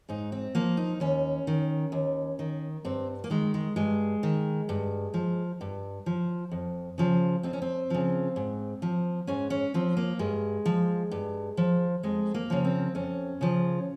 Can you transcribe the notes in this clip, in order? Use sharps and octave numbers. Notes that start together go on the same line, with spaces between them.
G#2 D#4
C4
F3 A#3
D#4
D#2 C#4
D#3
D#2
D#3
G2 C4
A#3
D#3 G#3
G#3
G2 G#3
D#3
G2
F3
G2
F3
F2
C#3 F3
F2 C4
C#4
C4
C#3 F3
G#2
F3
G#2 C#4
C#4
F3 C4
A#3
G2 G#3
F3
G2
F3
F2 G#3
A#3
C#3 F3
C4
F2 C#4
C#3 F3